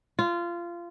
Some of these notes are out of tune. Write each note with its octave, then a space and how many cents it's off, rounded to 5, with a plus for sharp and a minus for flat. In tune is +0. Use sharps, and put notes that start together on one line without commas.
F4 -20